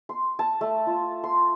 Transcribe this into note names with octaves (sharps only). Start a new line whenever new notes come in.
C6
A5
A3
F4
C6